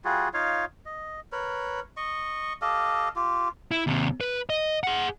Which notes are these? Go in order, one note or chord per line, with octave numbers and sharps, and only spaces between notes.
G3 F4 F#4 G#4
D#4 F4 C#5 F5
D#5
A#4 B4 C#5
D#5 C#6
G4 A4 D#5 F5
F4 G4
E4
D#2 C3
B4
D#5
G#4 F#5